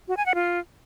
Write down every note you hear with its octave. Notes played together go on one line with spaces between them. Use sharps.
F#4
G#5
F#5
F4